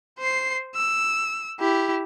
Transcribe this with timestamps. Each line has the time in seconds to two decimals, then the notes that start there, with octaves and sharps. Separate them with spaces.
0.19 C5 C7
0.75 E6
1.60 E4 G4